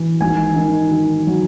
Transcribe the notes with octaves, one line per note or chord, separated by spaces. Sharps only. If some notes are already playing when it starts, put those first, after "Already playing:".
Already playing: E3
G#1 G#5
D#3
D#3
F#3